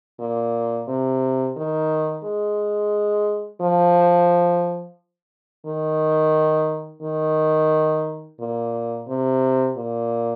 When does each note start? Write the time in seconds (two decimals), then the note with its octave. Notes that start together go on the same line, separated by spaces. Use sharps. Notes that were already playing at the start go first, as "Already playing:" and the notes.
0.20 A#2
0.88 C3
1.57 D#3
2.24 G#3
3.61 F3
5.66 D#3
7.02 D#3
8.40 A#2
9.07 C3
9.77 A#2